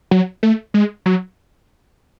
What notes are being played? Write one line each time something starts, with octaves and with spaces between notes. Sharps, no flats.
F#3
A3
G#3
F#3